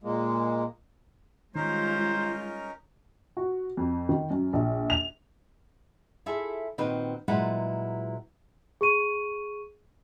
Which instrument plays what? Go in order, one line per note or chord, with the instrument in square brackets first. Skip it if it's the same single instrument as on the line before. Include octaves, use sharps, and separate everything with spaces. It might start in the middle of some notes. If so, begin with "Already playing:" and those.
[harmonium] A#2 G#3 A#3
[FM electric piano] D#3 [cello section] G3 G#3 F4 [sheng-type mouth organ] C#4 D#4 A#4 [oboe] C5
[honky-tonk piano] F#4
F2
D#3
F#2
A#1
F7
[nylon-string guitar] E4 F4 G#4 A4 E5
A#2 D#3 C4 F#4 B4 D#5
A#2 F#3 G#3 E4 B4 F#5
[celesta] G#4 C#6 D#7